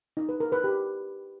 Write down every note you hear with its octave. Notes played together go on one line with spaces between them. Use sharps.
D#4
B4
A#4
B4
G4